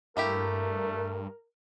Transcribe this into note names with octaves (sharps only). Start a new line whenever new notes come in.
G2 A3 A#3 E4 G4 A#4